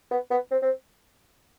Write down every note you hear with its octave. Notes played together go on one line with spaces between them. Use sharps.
B3
B3
C4
C4